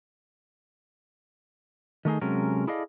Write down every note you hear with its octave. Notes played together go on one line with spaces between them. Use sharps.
D#3 A3 D#4 G#4
C3 F#3 G#3 C#4 A4 A#4
E4 G#4 A4 D5 D#5 F5